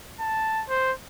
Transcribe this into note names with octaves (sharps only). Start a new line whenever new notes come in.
A5
C5